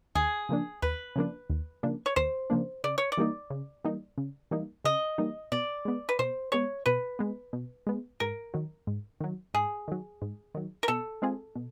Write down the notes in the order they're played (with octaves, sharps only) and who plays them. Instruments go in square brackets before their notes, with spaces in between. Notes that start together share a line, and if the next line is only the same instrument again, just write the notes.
[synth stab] D#2 [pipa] G#4
[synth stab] C#3 F3 A#3 D4
[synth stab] D#2 [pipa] B4
[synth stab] C#3 F3 A#3 D4
D#2
C#3 F3 A#3 D4
[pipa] C#5
[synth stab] D#2 [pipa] C5
[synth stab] C#3 F3 A#3 D4
[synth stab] C#3 [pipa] D5
[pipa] C#5
D5
[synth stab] E3 G3 A#3 D#4
C#3
E3 G3 A#3 D#4
C#3
E3 G3 A#3 D#4
[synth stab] C#3 [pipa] D#5
[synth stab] E3 G3 A#3 D#4
[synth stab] B2 [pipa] D5
[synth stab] G#3 B3
[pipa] B4
[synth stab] B2 [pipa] C5
[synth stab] G#3 B3 [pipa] C#5
[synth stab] B2 [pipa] B4
[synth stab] G#3 B3
B2
G#3 B3
[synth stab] G#2 [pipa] A#4
[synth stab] D#3 F#3
G#2
D#3 F#3
[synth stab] G#2 [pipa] G#4
[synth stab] D#3 F#3
G#2
D#3 F#3
[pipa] A#4
[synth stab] B2 [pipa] A4
[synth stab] G#3 C4 F4 G#4
B2